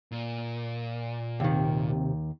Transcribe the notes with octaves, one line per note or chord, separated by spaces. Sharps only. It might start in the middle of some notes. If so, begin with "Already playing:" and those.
A#2
D#2 C3 D#3